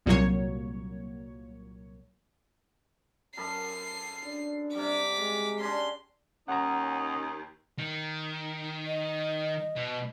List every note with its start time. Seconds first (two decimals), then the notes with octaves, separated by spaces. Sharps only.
0.06 C2 A#2 F#3 A#3 C#5
3.37 F#2 A4 B5 C7
4.25 D4
4.75 C3 G3 D6 B6
5.20 G#3
5.60 C#3 D4 C6
6.48 D#2 C#4 D#4 F#5 A#5
7.78 D#3
8.87 D#5
9.76 B2